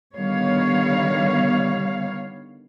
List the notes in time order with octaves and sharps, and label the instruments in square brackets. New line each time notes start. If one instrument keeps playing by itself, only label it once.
[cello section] D3 D#3 G3 B3 C#5 F5